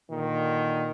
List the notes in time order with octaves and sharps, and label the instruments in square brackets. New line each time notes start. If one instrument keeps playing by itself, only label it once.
[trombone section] A#2 D3 D#3